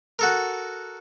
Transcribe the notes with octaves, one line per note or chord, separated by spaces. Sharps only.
F#4 A4 A#4